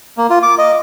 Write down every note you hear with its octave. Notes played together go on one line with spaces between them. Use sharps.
A#3
F4
D6
D#5